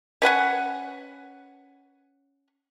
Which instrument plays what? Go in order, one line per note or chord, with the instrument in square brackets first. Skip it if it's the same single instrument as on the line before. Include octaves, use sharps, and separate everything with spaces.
[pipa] C#4 B4 F#5 G#5